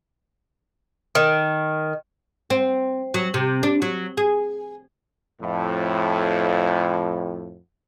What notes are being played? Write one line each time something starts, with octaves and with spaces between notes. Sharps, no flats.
D#3
C4
F#3
C3
D4
F#3
G#4
F2 A2